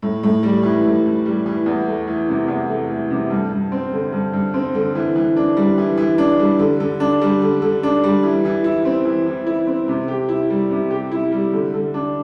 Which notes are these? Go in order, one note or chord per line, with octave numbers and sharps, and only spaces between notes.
A2
A2
G3
E3
A2
A2
G3
E3
E2
A3
E3
C3
E2
A3
E3
C3
G2
G2
C4
D3
G2
G2
C4
D3
E3
E3
D4
G3
E3
E3
D4
G3
D3
D3
D4
G3
D3
D3
D4
G3
E3
E3
E4
C4
E3
E3
E4
C4
C3
G4
E4
G3
C3
G4
E4
G3
D3
D3
D4